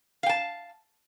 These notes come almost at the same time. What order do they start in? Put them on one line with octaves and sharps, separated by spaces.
F5 G5 A5